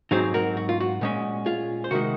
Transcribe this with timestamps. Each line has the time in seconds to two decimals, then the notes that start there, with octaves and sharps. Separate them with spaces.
0.11 G#2 F#3 C4 D#4 G#4 C5
0.34 F#4 A#4
0.57 F#4
0.69 F4
0.80 F#4
1.01 A#2 G#3 C#4
1.46 F4 G#4
1.84 C5
1.91 C3 D#3 G#3 F#4 A#4